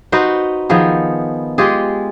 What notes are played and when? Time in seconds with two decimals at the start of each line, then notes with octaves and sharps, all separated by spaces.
0.12 D#4 F#4 B4 C5
0.69 D#3 F3 B3 G#4
1.58 G#3 F4 G4 G#4